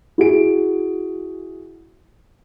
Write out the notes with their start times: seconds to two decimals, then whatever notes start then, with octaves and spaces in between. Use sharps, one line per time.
0.18 E4 F#4 G#4 D7